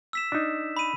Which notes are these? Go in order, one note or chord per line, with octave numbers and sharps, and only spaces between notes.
E6 B6 E7
D4 D#4
B5 D#7